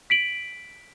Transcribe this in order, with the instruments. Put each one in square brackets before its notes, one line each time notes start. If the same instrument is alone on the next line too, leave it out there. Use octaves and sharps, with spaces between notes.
[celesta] B6 D7 F#7